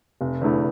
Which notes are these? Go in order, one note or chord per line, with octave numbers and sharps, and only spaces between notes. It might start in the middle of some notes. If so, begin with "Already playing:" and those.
F1
E2 D3 A3 E4